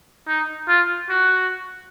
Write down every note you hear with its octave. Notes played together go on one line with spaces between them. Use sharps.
D#4
F4
F#4